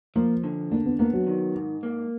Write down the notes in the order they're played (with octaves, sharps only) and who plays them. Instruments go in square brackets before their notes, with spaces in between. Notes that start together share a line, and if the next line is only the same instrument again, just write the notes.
[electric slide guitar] F3 [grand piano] A#3
[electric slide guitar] D3
[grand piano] A#3 [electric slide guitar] D4
[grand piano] B3
[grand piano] A#3 [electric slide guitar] B3
[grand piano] F#3
[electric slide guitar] D#3
G#2
A#3